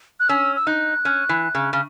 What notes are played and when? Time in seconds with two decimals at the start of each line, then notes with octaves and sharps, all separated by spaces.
0.20 F#6
0.29 C#4 E6
0.56 E6
0.67 D#4 F#6
1.05 C#4
1.29 E3
1.55 C#3
1.73 C#3